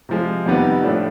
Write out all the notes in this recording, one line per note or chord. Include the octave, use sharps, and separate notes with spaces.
C3 F3 G#3
F2 C3 D#3 G3 B3
A2 F3 A3 D4